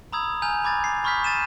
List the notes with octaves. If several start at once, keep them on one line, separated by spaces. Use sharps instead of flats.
A#5 B5 D#6 E6 G#6
G#5 A#5 F6 G6 F7
B5 D6 G#6 A6
C7
B5 C#6 D#6 F6 G6 B6
G6 A6 D#7 E7